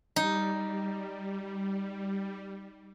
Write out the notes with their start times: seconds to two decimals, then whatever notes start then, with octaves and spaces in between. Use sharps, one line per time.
0.16 G3 D#4